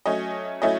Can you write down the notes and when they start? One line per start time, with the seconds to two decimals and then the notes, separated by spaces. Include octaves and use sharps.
0.06 F#3 A3 C#4 D#5
0.62 F#3 A3 C#4 E4 D#5